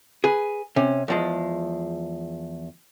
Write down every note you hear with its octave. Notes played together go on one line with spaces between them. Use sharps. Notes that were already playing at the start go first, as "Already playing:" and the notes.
G#4 B4
C3 C#4
E2 F3 G#3